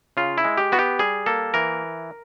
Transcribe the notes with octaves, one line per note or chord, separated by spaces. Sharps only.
C#3 F4
E4
G#3
G4
B3 F#4
G4
G3 G#4
A#3 A4
E3 A#4